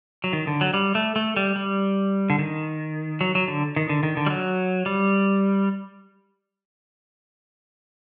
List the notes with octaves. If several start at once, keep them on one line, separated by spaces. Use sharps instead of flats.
F#3
D#3
D3
F#3
G3
A3
A3
G3
G3
D3
D#3
F#3
F#3
D3
D#3
D3
D#3
D3
G3
F#3
G3